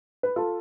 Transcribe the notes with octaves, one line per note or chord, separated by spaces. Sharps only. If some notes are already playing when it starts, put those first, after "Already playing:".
B4
F4 A4